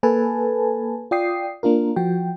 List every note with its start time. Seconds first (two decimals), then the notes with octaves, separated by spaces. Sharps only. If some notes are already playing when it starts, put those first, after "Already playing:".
0.03 A#3 A4 B4 G#5 A5
1.11 F4 D5 G5 D#6 C7
1.63 A#3 D4 F4 A#4
1.96 F3 F#4 G5